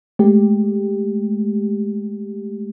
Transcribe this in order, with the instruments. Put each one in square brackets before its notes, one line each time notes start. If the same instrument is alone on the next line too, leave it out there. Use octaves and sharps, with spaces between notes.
[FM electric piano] G#3 A3 G4